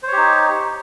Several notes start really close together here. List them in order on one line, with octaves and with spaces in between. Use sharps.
C5 C#5 G4 D#4